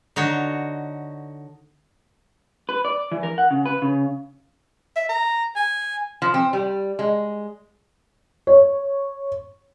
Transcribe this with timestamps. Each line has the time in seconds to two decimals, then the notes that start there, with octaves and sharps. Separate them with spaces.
0.16 D3 D#4 F#4 C#5
2.69 B4
2.85 D5
3.11 E3
3.23 A#4
3.38 F#5
3.51 C#3
3.66 B4
3.82 C#3
4.96 E5
5.09 A#5
5.56 G#5
6.22 F3
6.34 C4
6.53 G3
6.99 G#3
8.47 C#5